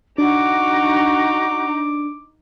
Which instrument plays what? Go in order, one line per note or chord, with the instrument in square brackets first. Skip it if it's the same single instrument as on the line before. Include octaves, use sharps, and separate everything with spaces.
[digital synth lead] D4 [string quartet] D#4 [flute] F#4 [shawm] D6